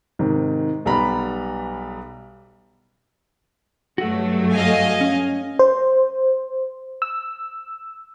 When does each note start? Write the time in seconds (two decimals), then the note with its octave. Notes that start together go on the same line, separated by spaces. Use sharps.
0.19 G#2 C3 D#3
0.85 B1 G3 B3 A#5 B5
3.98 G2 F#3 A3 F#4 F#5
4.52 D#5 F5 G#5
5.01 C#4
5.59 C5
7.02 E6